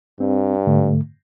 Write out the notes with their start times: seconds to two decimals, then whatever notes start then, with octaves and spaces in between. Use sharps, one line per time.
0.20 G2 C4
0.67 G#2 D3 A3